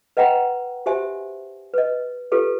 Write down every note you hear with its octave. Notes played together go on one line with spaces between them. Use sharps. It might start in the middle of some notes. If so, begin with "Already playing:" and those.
B4 D#5 F#5 G5 A#5 B5
F#4 G4 C5 E5 G#5
B4 D#5
F4 G4 A4 B4